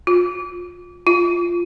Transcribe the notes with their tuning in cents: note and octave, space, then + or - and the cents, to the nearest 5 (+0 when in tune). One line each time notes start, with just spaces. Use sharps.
F4 +25
F4 -5